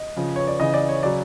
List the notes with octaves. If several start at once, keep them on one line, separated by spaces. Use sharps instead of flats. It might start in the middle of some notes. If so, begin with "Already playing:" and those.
Already playing: D#5
C#3 F3
C#5
D5
C#3 E3 D#5
D5
C#5
C#3 F#3 D5